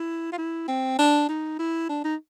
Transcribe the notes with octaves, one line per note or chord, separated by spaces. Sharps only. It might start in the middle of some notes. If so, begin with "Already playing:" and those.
Already playing: E4
F4
E4
C4
D4
D#4
E4
D4
D#4